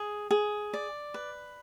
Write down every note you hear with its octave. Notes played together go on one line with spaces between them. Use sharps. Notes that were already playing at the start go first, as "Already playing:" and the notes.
Already playing: G#4
G#4
D5
B4